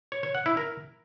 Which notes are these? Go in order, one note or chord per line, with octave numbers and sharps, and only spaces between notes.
C#5
C#5
F#5
E4
A#4